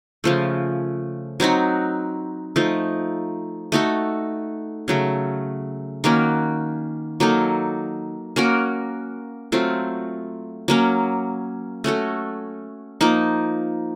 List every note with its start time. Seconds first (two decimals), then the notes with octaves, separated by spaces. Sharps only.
0.24 C#3 F3 A3
1.40 F#3 C4 D#4 F#4
2.56 F3 A3 D#4
3.72 A3 D#4 F#4 A4
4.88 C#3 F#3 A3
6.04 D#3 A#3 C#4 F#4
7.20 F#3 A#3 D#4 A4
8.36 A#3 C#4 F#4 A#4
9.52 F#3 A3 C4 F4
10.68 F#3 A#3 C#4
11.84 A3 C#4 F#4 A4
13.01 F3 A#3 D#4